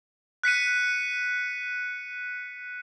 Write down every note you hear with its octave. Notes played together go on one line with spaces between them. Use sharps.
F#6 B6 C#7 D#7